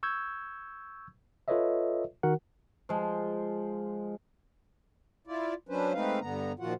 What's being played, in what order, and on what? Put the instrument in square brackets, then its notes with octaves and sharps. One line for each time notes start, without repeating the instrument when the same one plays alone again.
[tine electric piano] C#6 E6 G6 G#6
F4 A4 B4 C#5 D#5 E5
D#3 F#4 A#4 F#5
[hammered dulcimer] F3 G#3
[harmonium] E4 F4 D5
F#3 C#4 D4 B4 C5
G#3 A3 C4 D#4 B4 F5
G2 D3 B3 A#5
A#2 D#3 F3 F4 F#4 F#5